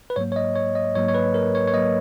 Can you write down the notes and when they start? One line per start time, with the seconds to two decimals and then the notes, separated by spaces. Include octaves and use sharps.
0.10 B4
0.16 G#2 F#3 A#3 C#5
0.32 C#5
0.36 D#5
0.56 C#5
0.75 D#5
0.95 G#2 F#3 A#3 C#5
1.08 C#5
1.15 B4
1.34 A#4
1.55 C#5
1.68 C#5
1.74 A#3 D#5
1.76 F#3